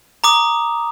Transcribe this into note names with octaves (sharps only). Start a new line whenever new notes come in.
A#5 D6 D#6